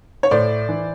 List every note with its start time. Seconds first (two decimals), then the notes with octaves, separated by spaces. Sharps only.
0.23 C#5
0.31 A2 C5 D5
0.69 E3